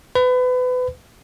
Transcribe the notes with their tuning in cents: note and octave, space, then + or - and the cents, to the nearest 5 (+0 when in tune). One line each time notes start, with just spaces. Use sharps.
B4 +30